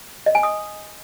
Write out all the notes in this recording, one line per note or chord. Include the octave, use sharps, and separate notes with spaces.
D#5
G#5
D#6